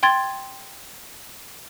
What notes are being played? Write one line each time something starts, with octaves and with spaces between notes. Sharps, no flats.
G5 C6 G#6 A6